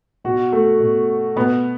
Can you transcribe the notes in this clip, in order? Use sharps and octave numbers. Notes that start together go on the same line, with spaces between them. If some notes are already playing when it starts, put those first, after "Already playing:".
B2 F#4
A3
B2
B2 B3